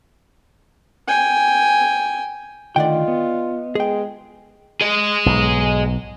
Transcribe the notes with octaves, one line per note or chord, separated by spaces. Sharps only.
G5 G#5
D3 D#3 A3 F4 D5 D#5 F#5 G5
B3
G#3 G#4 G5
G#4 D#5
B1 G#2